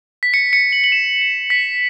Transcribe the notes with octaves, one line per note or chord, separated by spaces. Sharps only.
B6
C#7
C#7
F#7
F#7
E7
C#7
B6